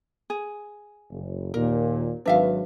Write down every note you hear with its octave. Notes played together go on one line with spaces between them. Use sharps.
G#4
F#1
D#2 A#2 A#4
G#1 F#3 D4 B4 E5 F5